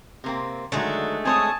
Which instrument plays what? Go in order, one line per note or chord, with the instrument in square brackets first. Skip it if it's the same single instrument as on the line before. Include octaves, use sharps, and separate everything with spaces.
[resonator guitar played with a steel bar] C3 A#3 C4
[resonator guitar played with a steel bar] D3 D#3 F#3 [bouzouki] G#3 A3
[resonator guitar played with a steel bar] C4 C5 C#5 [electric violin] G#5 A5 [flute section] D#6